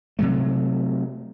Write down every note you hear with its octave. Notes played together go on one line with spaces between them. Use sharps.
C3 F#3 A3